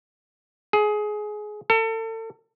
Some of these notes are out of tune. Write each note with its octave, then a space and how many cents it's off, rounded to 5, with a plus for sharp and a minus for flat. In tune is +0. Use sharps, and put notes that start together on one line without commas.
G#4 +20
A4 +35